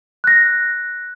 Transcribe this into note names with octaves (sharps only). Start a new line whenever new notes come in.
F#6 A#6